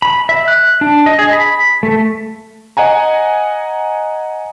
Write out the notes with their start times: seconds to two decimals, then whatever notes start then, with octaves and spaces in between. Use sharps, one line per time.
0.02 B5
0.29 E5
0.48 F#6
0.81 D4
1.06 D#5
1.19 G#4
1.33 B5
1.83 A3
2.77 D#5 F#5 G#5 A#5